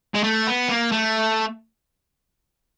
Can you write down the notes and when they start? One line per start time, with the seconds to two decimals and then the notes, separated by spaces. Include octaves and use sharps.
0.14 G#3
0.24 A3
0.47 B3
0.69 A#3
0.92 A3